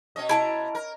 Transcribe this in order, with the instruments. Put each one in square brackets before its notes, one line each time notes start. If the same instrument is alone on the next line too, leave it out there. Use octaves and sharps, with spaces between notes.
[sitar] B2 C#4 D#5
[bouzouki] E4 A5 A#5
[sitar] A#4